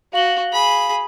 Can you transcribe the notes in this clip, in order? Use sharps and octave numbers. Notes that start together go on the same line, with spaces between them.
F#4 F5 F#7 G7
G#4 B5